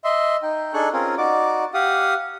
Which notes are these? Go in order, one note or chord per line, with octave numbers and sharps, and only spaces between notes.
D#5 E5 C6
D#4 G5
D4 D#4 G#4 A4 C#6 F#6
C4 C#4 F4 G#4 A#4
D#4 F#4 D5 D6
G4 F5 F#5 D#6